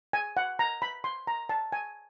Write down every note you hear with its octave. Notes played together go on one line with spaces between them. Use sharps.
G#5
F#5
A#5
B5
C6
A#5
A5
G#5